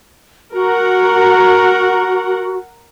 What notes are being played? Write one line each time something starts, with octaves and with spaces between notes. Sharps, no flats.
F#4 A#4 F#5